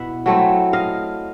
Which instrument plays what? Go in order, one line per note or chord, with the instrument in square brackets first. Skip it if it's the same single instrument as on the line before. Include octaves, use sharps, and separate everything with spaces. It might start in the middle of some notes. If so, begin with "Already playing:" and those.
Already playing: [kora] B2 B3 E4 E5 F#5
F#3 A3 C4 E4
D#5 F5